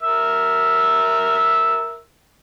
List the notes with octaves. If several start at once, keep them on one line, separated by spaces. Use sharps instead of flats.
A#4 E5 E6